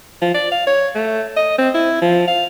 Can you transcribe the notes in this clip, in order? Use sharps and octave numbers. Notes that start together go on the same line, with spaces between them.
F3
D5
F5
C#5
A3
D#5
C4
E4
F3
F5